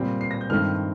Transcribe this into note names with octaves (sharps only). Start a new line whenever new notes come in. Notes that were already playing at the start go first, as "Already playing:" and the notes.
Already playing: A#2 G3 C4
C7
A#6
G6
G2 D#3 A3 C4 F6